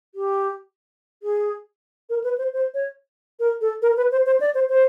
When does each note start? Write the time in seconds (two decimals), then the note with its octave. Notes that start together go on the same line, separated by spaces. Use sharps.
0.15 G4
1.23 G#4
2.10 A#4
2.24 B4
2.38 C5
2.53 C5
2.74 C#5
3.40 A#4
3.61 A4
3.82 A#4
3.97 B4
4.12 C5
4.26 C5
4.41 D5
4.55 C5
4.69 C5